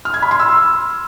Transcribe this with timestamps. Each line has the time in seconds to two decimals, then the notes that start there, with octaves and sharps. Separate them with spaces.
0.05 F6
0.14 G#6
0.22 B5
0.31 C6
0.40 E6